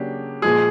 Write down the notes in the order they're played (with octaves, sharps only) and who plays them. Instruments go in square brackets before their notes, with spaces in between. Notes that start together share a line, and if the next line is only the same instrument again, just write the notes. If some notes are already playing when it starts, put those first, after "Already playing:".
Already playing: [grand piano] C#3 F#3 A#3 D4 [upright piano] G4
[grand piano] A#2 F3 G#3 [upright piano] G#4